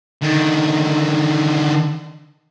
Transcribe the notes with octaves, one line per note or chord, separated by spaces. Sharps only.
D3 D#3